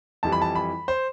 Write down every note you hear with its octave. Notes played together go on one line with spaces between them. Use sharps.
F2 E3 G3 A5
B5
A5
B5
C5